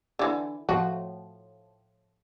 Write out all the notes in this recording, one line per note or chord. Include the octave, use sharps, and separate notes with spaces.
D3 E3
A2 F3 F#4